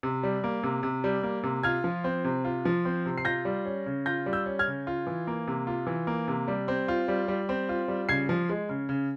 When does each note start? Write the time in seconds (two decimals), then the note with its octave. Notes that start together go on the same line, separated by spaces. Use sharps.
0.03 C3
0.23 G3
0.44 A#3
0.63 C3
0.83 C3
1.04 G3
1.23 A#3
1.43 C3
1.63 F4 F6 G#6
1.84 F3
2.04 C4
2.24 C3
2.45 F4
2.65 F3
2.85 C4
3.06 C3
3.18 C7
3.25 F4 G6 A#6
3.45 G3
3.65 C#4
3.86 C#3
4.06 F4 G6 A#6
4.26 G3
4.33 E6 G6
4.46 C#4
4.59 F6 G#6
4.67 C#3
4.87 F4
5.07 E3
5.27 A#3
5.47 C3
5.67 F4
5.87 E3
6.07 A#3
6.28 C3
6.48 G3
6.68 C4
6.88 F4
7.08 G3
7.28 G3
7.49 C4
7.69 F4
7.88 G3
8.09 C#3 G#6 C7
8.29 F3
8.50 G#3
8.69 C#3
8.89 C#3